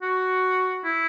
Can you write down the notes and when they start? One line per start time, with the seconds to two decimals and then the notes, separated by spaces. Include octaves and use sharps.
0.02 F#4
0.84 E4